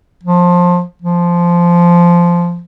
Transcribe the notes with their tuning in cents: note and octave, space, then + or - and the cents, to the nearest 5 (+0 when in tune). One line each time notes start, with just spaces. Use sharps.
F3 +20
F3 -10